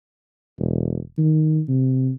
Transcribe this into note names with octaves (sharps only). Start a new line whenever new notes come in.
E1
D#3
C3